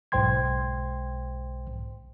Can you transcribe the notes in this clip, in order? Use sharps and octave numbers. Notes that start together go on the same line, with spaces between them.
B1 G#2 C5 G5 C6 G#6